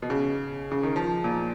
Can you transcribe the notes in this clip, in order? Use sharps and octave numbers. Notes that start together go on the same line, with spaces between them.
B2
C#3
C#3
D#3
F3
A#2